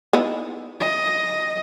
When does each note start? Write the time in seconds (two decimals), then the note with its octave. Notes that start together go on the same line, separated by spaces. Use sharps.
0.13 B3 D#4 E4
0.80 D#5